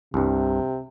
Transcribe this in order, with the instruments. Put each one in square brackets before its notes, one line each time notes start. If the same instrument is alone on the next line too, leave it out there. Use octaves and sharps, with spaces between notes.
[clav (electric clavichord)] C2 G2 [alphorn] C3